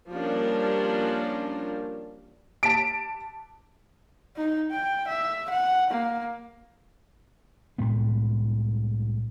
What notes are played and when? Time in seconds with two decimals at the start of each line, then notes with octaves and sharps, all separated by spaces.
0.11 F3 G3 A#3 C#4 D4 A#4
2.63 A5 B6 D7
4.36 D#4
4.71 G5
5.08 E5
5.50 F#5
5.91 A#3
7.78 C2 A2 G#3 B3